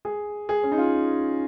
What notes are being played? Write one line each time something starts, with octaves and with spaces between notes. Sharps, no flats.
G#4
G#4
C#4
D#4
F4